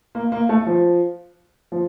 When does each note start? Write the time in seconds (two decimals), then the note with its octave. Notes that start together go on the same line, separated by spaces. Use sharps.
0.15 A#3
0.32 A#3
0.49 A3
0.66 F3
1.72 F3